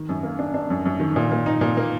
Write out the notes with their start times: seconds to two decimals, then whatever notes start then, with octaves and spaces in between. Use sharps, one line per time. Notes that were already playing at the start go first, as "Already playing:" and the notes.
Already playing: D#3
0.09 F#2
0.23 A#3
0.39 D4
0.54 D4
0.70 F#2
0.85 F#2
1.00 D#3
1.16 A#2
1.32 A#2
1.46 D#4
1.61 A#2
1.77 A#3